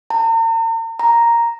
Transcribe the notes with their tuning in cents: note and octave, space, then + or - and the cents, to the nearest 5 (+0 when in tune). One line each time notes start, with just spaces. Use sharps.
A#5 -45
A#5 +0